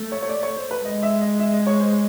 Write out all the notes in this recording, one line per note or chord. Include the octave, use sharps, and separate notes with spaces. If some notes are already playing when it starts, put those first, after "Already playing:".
Already playing: A3
C#5
C#5
D5
C#5
C5
B4
G#3 D#5
E5
D#5
E5
D#5
C#5
C5
C#5